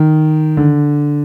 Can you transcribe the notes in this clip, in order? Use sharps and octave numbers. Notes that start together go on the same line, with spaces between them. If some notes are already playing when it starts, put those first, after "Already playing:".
Already playing: D#3
D3